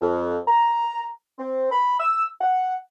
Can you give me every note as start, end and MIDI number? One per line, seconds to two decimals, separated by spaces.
0.01 0.39 41
0.48 1.08 82
1.39 1.70 60
1.71 1.98 83
2.00 2.26 88
2.41 2.74 78